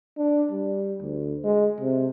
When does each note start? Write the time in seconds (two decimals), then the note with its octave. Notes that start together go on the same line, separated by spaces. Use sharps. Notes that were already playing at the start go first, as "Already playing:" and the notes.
0.18 D4
0.51 G3
1.01 D2
1.44 G#3
1.81 C3